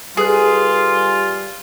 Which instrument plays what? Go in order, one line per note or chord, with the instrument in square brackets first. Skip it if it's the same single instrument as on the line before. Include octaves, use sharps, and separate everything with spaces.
[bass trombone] G3 [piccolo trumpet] F4 [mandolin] G#4 [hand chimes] A4 B4 F#6